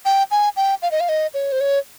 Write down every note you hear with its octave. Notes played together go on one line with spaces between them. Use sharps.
G5
G#5
G5
F5
D#5
F5
D#5
C#5
C5
C#5